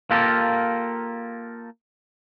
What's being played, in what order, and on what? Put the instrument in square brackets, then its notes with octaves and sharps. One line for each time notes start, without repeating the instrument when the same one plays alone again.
[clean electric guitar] A#3 F4 G4 A4 A#4